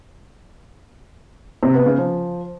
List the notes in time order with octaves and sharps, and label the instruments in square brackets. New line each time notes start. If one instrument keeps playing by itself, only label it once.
[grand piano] C3
B3
C#3
F3